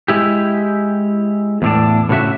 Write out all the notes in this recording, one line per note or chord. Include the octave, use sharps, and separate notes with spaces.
G#3 E4 G4
E2 A2 D4
A2 C#3 F#4 E5